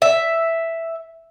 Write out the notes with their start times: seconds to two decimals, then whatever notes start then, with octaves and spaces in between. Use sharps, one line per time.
0.02 E5